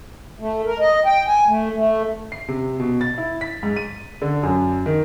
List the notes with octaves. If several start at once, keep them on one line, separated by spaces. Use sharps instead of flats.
A3
A#4
D#5
G5
G#5
A3
A3
C7
C3
B2
A6
E4
B6
G#2
D#7
D3
F#2
D#3